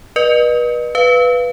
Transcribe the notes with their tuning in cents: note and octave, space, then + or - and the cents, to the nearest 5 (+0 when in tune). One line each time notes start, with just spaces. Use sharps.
B4 -35 D#5 -40
B4 +0 F5 -15